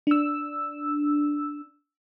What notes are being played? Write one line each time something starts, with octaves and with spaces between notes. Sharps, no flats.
D4 E6